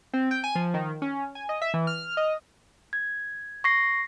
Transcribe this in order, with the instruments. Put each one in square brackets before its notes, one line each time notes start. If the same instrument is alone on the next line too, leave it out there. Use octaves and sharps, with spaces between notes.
[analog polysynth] C4
G5
G#5
F3
D#3
C#4
G#5
D#5
E5
E3
F6
D#5
[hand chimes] G#6
C#6 A#6 C7